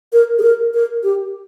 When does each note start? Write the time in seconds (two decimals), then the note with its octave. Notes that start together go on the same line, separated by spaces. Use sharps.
0.13 A#4
0.38 G#4
0.43 A#4
0.74 A#4
1.03 G4